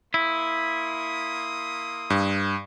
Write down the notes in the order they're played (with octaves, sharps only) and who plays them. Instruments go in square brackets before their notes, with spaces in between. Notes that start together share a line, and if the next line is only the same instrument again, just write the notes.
[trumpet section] A#3 C6 D#6 [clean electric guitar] E4
[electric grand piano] G2